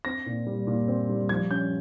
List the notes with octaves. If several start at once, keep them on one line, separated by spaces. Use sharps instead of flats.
C4 A#6
A#2
G3
A#2
C4
G3
F3 G#6
C#4 G6